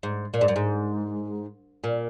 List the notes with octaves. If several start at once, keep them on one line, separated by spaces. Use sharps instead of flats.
G#2
A#2
G#2
F#2
G#2
A#2